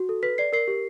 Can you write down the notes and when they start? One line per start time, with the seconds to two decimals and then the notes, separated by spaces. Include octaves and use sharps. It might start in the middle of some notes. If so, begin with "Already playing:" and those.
Already playing: F#4
0.09 A4
0.23 B4 B6
0.38 D5 C7
0.53 A#4 C7
0.68 G4